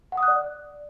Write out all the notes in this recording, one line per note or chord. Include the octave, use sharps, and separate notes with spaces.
F#5
D#6
F#6
D5